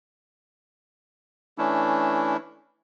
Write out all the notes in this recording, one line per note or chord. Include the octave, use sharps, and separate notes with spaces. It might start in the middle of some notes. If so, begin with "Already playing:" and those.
E3 A3 C#4 D4 E4